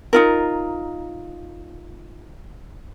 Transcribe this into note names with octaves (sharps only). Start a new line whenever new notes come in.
D#4 F4 A#4